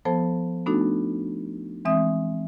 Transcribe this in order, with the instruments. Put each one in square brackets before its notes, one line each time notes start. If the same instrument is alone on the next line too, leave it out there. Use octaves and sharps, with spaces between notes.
[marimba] F3 B3 A4 C5 A5
A3 B3 D4 D#4 F#4 A4
E3 G#3 C4 E5 D#6